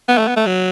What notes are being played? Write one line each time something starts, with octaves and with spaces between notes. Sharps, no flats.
B3
A3
B3
A3
F#3